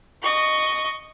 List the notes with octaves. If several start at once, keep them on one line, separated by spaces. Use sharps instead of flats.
D#5 C#6